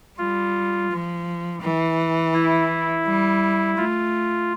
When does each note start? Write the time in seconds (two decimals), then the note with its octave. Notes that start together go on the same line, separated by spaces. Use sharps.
0.18 G3 F4
0.91 F3
1.62 E3
2.34 E4
3.05 G3
3.77 A3 F4